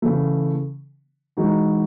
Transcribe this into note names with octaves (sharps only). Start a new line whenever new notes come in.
C#3 E3 A3
E3 G#3 D#4 F#4